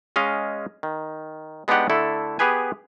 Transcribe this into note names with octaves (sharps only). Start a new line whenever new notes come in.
G#3 C#4 D#5 F5
D#3
G#3 B3 D4 D#4 G4 F#5
D3 A3 E4 A4
B3 G4 G#4 B4 G#5